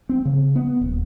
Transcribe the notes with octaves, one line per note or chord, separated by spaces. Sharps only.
C4
C#3
B3
D#1